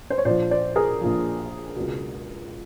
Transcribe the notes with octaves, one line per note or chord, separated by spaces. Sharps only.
C5
C#5
A#1 A#2 F3 C5 D5
C5 D5
G#4 A#4
A#1 A#2 F3
C#2 B2